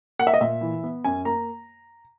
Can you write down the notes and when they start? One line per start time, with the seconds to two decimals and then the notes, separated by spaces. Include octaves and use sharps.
0.19 A#3 F#5
0.27 E5
0.34 D#5
0.41 A#2 E5
0.61 E3
0.84 B3
1.04 F#2 G#5
1.25 A#3 A#5